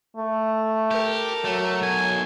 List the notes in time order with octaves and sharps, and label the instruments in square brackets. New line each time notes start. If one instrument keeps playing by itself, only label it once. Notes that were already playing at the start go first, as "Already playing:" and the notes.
[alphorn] A3
[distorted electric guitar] G4 [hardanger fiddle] A4 A#4
[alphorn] F#3 [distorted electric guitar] A3
[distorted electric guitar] B1 G#5